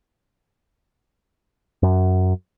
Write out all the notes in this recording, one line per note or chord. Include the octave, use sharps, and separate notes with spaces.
F#2